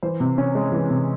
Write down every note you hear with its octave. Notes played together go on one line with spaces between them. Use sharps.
E3 C5
C3
C#4
G#3
E3
C3